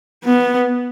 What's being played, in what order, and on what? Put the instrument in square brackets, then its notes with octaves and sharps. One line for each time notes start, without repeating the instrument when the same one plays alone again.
[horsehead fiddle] B3